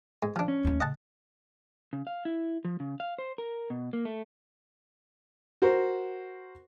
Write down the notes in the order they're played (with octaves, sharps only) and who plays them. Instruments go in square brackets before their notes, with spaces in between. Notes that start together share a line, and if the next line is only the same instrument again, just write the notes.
[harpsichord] G#2
F3 D4
[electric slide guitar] C#4
[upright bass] D#2 A3
[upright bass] C#3 [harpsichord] D#5 F#5 A5
[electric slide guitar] C#3
F5
E4
F3
C#3
F5
C5
A#4
B2
A#3
A3
[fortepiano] F#4 A#4 C5 C#6